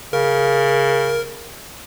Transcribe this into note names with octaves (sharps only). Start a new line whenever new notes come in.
C#3 A#4